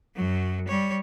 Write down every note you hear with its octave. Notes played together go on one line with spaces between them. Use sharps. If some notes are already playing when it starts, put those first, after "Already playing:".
F#2 F#3
G3 C#5